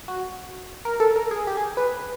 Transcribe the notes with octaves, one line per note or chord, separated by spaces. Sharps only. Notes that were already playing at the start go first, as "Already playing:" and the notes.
F#4
A#4
A4
A#4
G#4
G4
G#4
B4